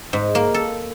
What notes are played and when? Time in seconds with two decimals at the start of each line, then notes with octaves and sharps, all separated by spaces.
0.13 G#2
0.35 A#3
0.54 A4